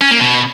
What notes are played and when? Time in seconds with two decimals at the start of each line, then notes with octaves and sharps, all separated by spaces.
0.01 C#4
0.11 A#3
0.21 B2